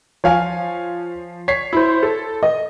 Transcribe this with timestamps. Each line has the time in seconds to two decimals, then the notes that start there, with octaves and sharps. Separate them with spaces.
0.24 F3 C#5 F5 G#5
1.48 C#5 B6 C7
1.73 E4 C5
2.03 A4
2.43 D#5